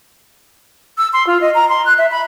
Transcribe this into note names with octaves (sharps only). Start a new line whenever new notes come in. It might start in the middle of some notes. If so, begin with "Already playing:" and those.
E6
C6
F4
D#5
A#5
C6
F#6
E5
B5